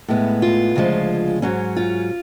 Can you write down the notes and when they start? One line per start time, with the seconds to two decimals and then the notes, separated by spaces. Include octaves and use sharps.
0.08 A2 G#3 B3
0.42 F4
0.75 D2 C#3 F3 G#3
1.42 G#2 F#3 C#4
1.76 F4